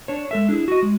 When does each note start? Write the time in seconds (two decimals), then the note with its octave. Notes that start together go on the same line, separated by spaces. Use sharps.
0.08 D4 C#5
0.31 G#3 A4 E5
0.49 D4 E4 G#4
0.68 F#4 D#5
0.83 G#3